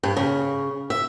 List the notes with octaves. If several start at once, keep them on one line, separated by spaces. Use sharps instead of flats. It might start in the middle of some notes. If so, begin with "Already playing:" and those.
G2
C#3
E5